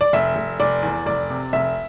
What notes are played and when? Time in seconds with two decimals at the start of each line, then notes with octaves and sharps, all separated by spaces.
0.01 D5
0.13 F1 E5
0.36 F1
0.60 F1 D5
0.83 E2
1.06 F1 D5
1.30 C3
1.53 F1 E5